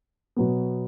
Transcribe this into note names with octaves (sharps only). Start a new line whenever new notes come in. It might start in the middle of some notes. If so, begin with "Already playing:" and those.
B2 F#3 B3